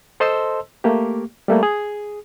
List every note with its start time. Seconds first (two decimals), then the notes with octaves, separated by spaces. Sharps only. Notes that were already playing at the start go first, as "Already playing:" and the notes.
0.20 A4 C5 D#5 A5 C6 E6
0.84 A3 A#3 G4
1.48 G3 A3 A#3
1.63 G#4